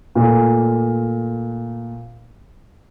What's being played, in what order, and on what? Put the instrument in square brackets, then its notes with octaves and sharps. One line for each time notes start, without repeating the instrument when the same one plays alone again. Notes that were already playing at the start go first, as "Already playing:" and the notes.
[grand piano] A#2 A3